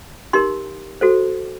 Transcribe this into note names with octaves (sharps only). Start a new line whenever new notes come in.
D#4 G4 A#4 C6
F#4 A4 C5